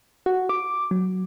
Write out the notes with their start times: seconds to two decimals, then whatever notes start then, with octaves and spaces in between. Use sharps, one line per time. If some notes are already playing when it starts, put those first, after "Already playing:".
0.26 F#4
0.49 D6
0.91 F#3